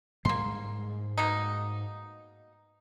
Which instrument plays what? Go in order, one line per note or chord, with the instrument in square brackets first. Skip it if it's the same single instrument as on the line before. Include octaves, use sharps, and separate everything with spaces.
[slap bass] G#2 G3 G#3 [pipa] A#3 C6
[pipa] B2 A#3 D#4